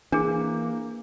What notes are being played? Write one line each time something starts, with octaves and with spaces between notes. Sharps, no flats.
E3 A#3 D4 G#4